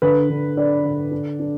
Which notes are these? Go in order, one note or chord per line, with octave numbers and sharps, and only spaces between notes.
D3 B4
D3
D4 D5
D3
D4
D4